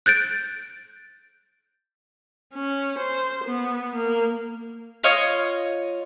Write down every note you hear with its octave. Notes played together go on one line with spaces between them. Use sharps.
F#6 G6 A6 D7
C#4
C5
B3
A#3
F4 C#5 D#5 F6